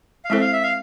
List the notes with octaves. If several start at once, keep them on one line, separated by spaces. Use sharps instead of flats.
F5
G#3 C4 E4 A4 C5 E5
F5
E5
F5